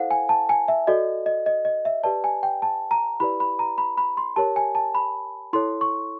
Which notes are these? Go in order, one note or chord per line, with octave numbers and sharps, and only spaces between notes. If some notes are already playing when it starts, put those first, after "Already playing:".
Already playing: E4 A4 C5 F5 F#5
G#5
A5
G#5
E5
F#4 A4 D5 D#5
D#5
D#5
D#5
E5
G4 B4 D5 A5
G#5
G5
A5
A#5
E4 G4 B4 D5 B5
B5
A#5
B5
B5
C6
G4 A#4 C#5 A5
G#5
A5
B5
E4 A4 C#5 C6
C#6